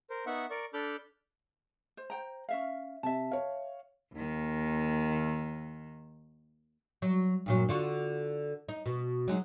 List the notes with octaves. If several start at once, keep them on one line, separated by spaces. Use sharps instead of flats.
A#4 C5
B3 D#4 E5 F#5 C#6
A#4 D5 C#6
D4 A4 B5 D6 F6 G6
C5
C5 G5 A#5
C#4 E5 F5
C3 E5 A5
C#5 F5
D#2 D#3
F#3
G2 A#2 F#3
D3 F4 F#4
D#4
B2
F#3 G#3 D#4